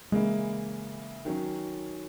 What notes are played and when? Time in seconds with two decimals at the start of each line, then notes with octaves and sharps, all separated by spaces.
0.12 C#3 E3 G#3 A#3 E4
1.25 D#3 F#3 C#4